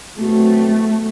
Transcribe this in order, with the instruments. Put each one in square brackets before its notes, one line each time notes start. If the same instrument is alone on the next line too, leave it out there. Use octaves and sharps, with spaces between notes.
[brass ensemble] B2 F#3 C4 F#4 [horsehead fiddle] A3